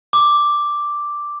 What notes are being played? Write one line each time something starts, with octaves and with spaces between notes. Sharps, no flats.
D6